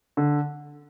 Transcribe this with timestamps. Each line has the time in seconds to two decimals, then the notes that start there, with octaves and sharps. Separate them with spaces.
0.17 D3